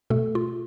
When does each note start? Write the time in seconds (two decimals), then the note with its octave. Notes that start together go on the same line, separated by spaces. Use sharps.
0.10 B2 A3 A4
0.35 F4